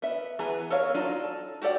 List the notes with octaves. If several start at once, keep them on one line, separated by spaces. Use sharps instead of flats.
B3 E5
E3 B3 G#4 A#5
A4 A#4 C#5 F5
F#3 D4 D#4 F4
A4
F#4 G4 A4 D5 F#5